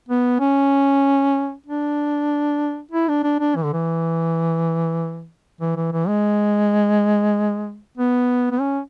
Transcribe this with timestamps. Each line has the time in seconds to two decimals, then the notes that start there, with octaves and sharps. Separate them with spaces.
0.09 B3
0.40 C#4
1.66 D4
2.92 E4
3.08 D4
3.23 D4
3.40 D4
3.56 E3
3.64 D3
3.73 E3
5.61 E3
5.76 E3
5.92 E3
6.08 G#3
7.98 B3
8.52 B3
8.60 C#4